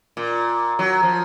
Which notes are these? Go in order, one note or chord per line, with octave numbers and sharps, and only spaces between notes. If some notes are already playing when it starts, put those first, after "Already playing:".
A#2
F#3
F3